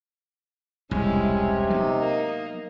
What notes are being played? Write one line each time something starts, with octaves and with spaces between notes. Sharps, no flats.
E1 C2 C3 G#3 C#4 E4
F#3 B3 D#4
A#3